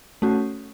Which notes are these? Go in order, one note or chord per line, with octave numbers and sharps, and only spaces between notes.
A3 C#4 F#4